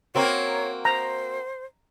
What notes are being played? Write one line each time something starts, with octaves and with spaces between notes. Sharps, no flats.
A#3 C4 F#4 C#5
C5 A#5